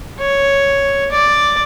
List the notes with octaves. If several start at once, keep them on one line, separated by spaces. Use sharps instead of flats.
C#5
D5